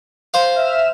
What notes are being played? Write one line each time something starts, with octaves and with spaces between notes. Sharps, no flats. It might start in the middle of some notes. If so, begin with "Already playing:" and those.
C5 F5
E5 F6 E7